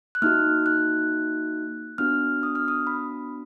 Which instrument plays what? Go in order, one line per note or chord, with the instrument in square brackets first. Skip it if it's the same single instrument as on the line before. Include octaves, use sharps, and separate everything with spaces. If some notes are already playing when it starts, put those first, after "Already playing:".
[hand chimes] F#6
A#3 D#4 F#4 F6
F#6
B3 D4 F#4 F6
D#6
F6
D#6
B5